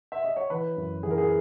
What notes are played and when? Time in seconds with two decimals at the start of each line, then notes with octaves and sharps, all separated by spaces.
0.12 E5
0.24 D#5
0.36 C#5
0.50 E3 B4
0.77 F#2
1.03 E3 G#4
1.11 A#4
1.18 G#4